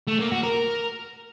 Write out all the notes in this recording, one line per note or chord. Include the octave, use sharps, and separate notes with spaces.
A3
A#3
F#4
A#4